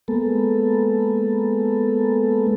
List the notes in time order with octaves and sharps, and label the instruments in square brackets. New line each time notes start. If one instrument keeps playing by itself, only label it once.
[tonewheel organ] G#3 A#3 B3 A4